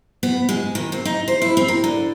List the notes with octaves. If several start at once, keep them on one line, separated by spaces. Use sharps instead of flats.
B3
G#3
D#3
C4
D#4
C5
E4
C4
A#4
D3